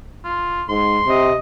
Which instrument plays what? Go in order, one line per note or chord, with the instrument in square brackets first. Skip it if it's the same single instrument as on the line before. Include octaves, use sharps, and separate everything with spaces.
[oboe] F4
[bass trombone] G#2 [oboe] C6
[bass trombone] C3 [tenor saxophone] D#5